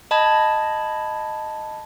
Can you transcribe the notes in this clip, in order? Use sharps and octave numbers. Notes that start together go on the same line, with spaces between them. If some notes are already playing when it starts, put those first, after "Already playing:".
D#5 A5 B5 G#6